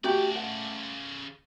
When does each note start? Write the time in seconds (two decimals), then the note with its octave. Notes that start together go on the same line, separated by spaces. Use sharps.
0.04 C#3 A3 F#4 G4 D5
0.35 F#5